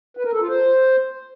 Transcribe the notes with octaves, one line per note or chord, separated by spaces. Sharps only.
B4
A#4
A4
F4
C5